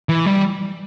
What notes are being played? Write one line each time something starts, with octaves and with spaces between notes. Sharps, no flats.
E3
G3